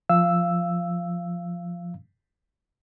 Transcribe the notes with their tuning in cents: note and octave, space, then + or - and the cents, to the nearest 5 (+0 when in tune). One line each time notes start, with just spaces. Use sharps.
F3 +0 F5 -20 E6 +0